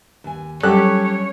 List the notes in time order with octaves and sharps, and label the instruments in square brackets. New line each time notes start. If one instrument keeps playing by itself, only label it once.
[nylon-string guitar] D#2 G#5
[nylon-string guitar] F#3 G3 [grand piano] C#4 [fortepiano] G4 A4 F#6 [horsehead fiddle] C#5